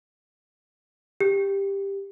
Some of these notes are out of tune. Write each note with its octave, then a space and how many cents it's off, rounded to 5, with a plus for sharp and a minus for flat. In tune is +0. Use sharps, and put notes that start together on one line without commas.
G4 +10